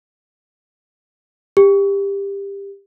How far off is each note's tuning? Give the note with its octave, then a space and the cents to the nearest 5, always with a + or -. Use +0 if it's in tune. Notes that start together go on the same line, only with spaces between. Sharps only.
G4 +20